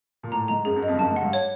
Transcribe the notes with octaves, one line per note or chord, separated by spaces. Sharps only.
A#2
A2 A#5
G#2 A#5
F#2 G#4
F#2
D#5
F2
G2
F#2 A5
G#2
G2 F#5
C#5